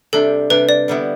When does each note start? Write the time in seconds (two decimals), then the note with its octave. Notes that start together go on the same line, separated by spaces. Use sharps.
0.13 C3 G3 D4 A4
0.50 C3 G3 D4 B4
0.69 D5
0.88 D3 G3 B3 E4